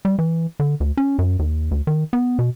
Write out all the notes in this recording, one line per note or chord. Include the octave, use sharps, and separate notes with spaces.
G3
E3
D3
D2
C#4
F#2
D#2
D2
D#3
B3
B2